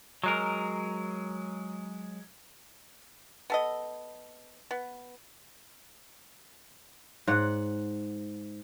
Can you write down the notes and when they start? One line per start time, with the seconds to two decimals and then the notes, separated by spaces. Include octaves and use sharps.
0.23 F#3 G#3 A#4
3.50 B3 A4 D#5
4.71 B3
7.27 G#2 F#5